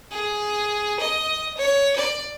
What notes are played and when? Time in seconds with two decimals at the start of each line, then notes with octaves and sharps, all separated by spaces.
0.12 G#4
1.00 D#5
1.57 C#5
1.96 D5